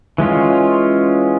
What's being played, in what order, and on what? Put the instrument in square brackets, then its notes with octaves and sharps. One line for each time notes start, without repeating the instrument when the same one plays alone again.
[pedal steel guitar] E3 G#3 C#4 F4